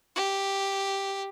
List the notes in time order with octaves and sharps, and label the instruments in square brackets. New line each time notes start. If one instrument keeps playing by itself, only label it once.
[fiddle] G4